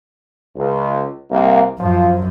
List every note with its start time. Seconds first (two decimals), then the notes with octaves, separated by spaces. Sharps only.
0.56 C#2
1.31 C2 A#3
1.79 F#2 F3